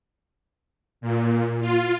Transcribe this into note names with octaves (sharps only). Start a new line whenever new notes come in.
A#2
F4